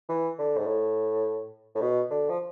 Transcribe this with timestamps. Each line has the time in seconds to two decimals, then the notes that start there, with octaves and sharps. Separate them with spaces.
0.09 E3
0.39 D3
0.58 G#2
0.67 A2
1.75 A2
1.82 B2
2.11 D3
2.29 F3